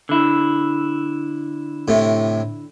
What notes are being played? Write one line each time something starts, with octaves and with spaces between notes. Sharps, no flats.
D3 E4
A2 C3